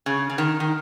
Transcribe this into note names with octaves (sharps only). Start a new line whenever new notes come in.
C#3
C#3
D#3
D#3